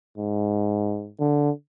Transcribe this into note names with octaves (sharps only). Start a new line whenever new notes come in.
G#2
D3